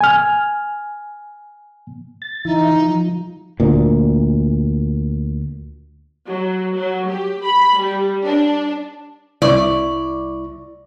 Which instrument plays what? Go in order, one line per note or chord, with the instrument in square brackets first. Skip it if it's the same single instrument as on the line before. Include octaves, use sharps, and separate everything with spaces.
[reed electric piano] G#5 F6
[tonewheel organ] A6
[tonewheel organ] E3 E4 [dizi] D#4
[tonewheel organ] F3
[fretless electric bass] D2 A#2
[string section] F#3
F#3
G4
B5
G3
D4
[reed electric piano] C2 E4 C#6 [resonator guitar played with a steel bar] D5